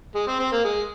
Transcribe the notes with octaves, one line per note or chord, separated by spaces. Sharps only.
G#3
C4
C4
A#3
G#3